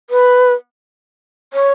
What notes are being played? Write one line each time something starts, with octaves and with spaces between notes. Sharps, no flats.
B4
C#5